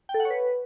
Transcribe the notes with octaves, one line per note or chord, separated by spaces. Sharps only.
G5
A4
F#5
C#5
B4